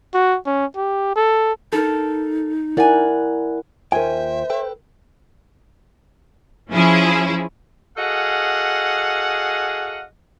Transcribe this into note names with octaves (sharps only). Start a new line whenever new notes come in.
F#4
C#4
G4
A4
D#4 A4 A#4
E4 A#4 D5 F#5 G#5
D#2 F4 A#4 C5 E5 G5 G#5
A4 B4 G5
F3 C#4 E4 G#4
F#4 G#4 A4 D#5 F5 F#5